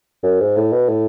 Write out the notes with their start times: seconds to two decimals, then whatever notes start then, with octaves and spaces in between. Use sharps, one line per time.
0.23 F#2
0.41 G#2
0.57 A2
0.73 B2
0.89 A2